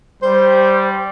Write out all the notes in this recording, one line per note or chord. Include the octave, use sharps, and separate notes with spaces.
G3 C5